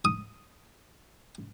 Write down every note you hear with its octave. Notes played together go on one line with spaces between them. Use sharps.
D#6